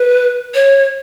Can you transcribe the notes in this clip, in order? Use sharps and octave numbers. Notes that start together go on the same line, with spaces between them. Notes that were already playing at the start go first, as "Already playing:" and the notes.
Already playing: B4
C#5